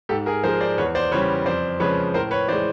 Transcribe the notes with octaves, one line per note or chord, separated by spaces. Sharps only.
G#2 G4 A4
G#4 A#4
F3 G#3 A#4 C5
C5 D5
E2 B4 C#5
C5 D5
C#3 E3 G3 B4 C#5
F2 C5 D5
C#3 F3 G#3 B4 C#5
A2 A#4 C5
B4 C#5
E3 G#3 C5 D5